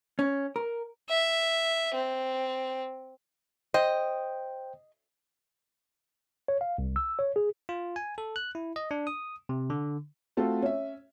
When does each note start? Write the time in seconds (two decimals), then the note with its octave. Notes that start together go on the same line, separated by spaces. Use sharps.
0.19 C#4
0.56 A#4
1.10 E5
1.94 C4
3.74 C5 D#5 G5
6.48 C#5
6.61 F5
6.78 C2
6.96 E6
7.19 C#5
7.36 G#4
7.69 F4
7.96 G#5
8.18 A4
8.36 F#6
8.55 E4
8.76 D#5
8.91 D4
9.07 D#6
9.49 C3
9.70 D3
10.37 A3 C4 F4 F#4 A4
10.62 C#4 E5